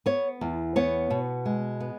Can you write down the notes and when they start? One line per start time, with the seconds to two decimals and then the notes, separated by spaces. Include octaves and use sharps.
0.06 B3 C#5
0.41 E2
0.76 B3 C#5
1.10 B2
1.46 G#3
1.80 B3